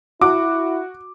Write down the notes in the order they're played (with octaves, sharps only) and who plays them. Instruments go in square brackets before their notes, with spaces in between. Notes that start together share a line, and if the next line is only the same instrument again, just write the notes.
[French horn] E4 [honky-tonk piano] F#4 [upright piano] D6